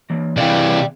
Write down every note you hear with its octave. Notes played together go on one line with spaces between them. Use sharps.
E3 A#3
C3 E3 G#4 D5 F5 G5